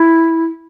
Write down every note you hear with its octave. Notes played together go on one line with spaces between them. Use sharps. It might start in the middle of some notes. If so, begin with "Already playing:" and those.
Already playing: E4